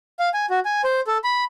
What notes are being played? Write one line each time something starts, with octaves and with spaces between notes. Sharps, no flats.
F5
G#5
F#4
G#5
C5
A4
B5